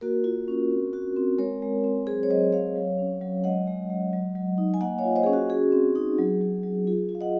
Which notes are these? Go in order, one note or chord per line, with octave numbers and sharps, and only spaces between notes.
A#3 F#4 A#4
F4
C#4
C4
F#4
C4
G#3 A#4 C#5
G#3
C4
F#3 G#4 C5
C#5
F#3 C5 D#5
F#3 C#5 F5
F#3
C#4
F#3
G#3 D#5 F#5
G#3
G#3
F#3
F#3
D#4
G#5
A#3 D#5 F#5
C#5 F5
F4
C5 D#5
C#4 G#4
F#4
F#4 G#4
C4
D#4
F#3
F#3
F#3
F4 G#4
F4
F5
D#5 F#5